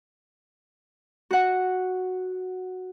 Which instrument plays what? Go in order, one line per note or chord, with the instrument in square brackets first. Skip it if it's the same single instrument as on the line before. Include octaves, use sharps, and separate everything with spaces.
[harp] F#4 F#5